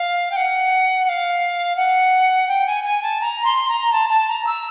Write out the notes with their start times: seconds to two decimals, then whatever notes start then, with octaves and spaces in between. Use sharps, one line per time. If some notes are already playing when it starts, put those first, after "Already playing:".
Already playing: F5
0.32 G5
0.36 F#5
1.05 F#5
1.09 F5
1.76 F#5
2.48 G5
2.67 G#5
2.84 G#5
3.03 A5
3.21 A#5
3.45 C6
3.69 A#5
3.92 A5
4.10 A5
4.28 A#5
4.47 E6